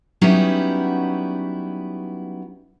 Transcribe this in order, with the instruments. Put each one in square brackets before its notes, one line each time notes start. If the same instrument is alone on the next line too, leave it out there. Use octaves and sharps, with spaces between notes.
[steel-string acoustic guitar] F#3 G3 B3 C#4 D#4 E4